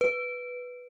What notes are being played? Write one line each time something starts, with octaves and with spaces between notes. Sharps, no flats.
B4